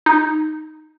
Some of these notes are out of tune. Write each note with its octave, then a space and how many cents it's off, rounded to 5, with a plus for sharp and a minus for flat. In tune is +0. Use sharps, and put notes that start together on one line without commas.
D#4 -5